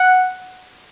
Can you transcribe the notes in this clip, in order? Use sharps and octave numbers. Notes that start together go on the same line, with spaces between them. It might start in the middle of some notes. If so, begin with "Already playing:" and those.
Already playing: F#5